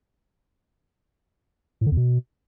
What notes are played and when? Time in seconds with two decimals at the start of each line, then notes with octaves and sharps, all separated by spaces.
1.81 A2
1.86 D3
1.92 E2
1.97 B2